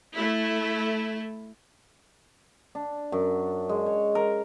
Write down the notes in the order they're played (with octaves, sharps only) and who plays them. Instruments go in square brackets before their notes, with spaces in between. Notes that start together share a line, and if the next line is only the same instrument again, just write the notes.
[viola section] A3 E4
[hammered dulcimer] D4
F#2
G#3
C#5
A#4